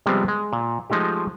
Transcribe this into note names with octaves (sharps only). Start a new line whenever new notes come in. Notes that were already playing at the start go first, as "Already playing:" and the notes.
C3 F3 G3 G#3 B3 C4
G#3
A#2
F3 G#3 A3 D#4 G4